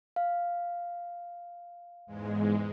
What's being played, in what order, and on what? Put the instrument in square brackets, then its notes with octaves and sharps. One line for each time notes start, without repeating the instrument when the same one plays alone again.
[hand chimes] F5
[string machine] E2 G#2 G#3